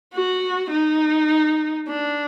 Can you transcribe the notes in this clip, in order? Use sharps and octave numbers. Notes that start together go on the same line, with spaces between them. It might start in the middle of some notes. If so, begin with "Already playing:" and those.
F#4
D#4
D4